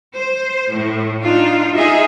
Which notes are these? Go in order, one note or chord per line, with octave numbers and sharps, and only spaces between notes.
C5
A2
D4 D#4 F4
D#4 F4 G#4 D#5 E5